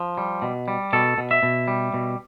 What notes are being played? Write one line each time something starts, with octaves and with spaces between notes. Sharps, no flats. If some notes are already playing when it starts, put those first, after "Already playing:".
Already playing: F3
G3
B2
G3
B2 A4
B2
E5
B2
G3
B2